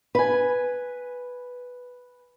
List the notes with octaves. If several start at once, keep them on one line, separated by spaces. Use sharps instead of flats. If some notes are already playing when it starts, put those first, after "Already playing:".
B4 G#5